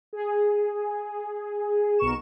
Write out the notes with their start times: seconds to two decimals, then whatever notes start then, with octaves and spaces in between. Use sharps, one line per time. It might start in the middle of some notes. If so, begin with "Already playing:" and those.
0.13 G#4
1.99 B1 B2 A#4 C#6 E7